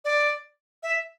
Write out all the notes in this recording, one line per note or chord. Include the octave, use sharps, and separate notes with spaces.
D5
E5